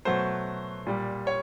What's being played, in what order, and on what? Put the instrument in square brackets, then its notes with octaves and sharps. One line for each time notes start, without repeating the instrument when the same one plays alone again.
[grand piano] B2 F#3 A3 C5
A#2 G3
C#5